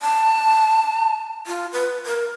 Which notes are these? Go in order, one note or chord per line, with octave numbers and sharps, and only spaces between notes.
A5
F4
B4
A#4